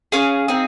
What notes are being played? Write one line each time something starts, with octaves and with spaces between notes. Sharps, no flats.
C#4 G#4 F5
C4 D#4 G#4